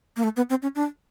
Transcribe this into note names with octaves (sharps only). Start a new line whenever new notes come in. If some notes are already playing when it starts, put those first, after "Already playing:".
A#3
A3
B3
C4
C#4
D4